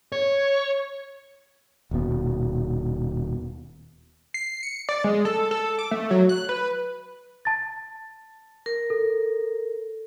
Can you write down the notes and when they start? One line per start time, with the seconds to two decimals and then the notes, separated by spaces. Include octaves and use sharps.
0.12 C#5
1.91 D#1 D#2 B2
4.34 C7
4.63 C#7
4.89 D5
5.04 G#3
5.25 A4
5.51 A4
5.79 D6
5.91 A3
6.11 F#3
6.29 F#6
6.49 B4
7.45 A5 A6
8.66 A#4
8.90 A4